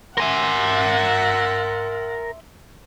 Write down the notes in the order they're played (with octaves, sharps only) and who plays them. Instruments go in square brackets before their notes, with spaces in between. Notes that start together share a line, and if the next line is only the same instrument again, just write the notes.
[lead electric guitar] A#4 G#5 [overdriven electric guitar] E5 C6 [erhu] F#5